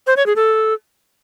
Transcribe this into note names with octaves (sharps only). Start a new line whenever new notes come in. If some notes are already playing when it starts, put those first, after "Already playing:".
C5
C#5
G#4
A4